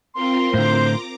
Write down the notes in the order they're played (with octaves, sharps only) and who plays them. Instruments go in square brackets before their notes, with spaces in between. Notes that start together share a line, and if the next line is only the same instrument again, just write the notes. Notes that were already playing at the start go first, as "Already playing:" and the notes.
[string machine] C4 F4 A#4 [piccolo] C6
[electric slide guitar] A2 D3 [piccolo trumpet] C5 [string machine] A#5 D6